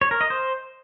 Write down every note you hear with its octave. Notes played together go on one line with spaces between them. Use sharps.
C#5
A#4
D#5
C5